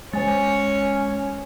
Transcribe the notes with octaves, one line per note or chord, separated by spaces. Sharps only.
G#3 C#4 C5 C#5 G#5 A6